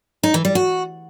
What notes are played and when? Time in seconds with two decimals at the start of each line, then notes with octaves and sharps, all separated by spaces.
0.23 D#4
0.34 E3
0.45 G3
0.55 F#4